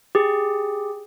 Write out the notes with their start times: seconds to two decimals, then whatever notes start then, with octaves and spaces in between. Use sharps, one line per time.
0.15 G4 G#4